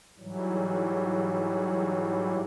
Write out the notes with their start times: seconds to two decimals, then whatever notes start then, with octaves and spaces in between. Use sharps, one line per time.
0.19 G#2 E3 F#3 G3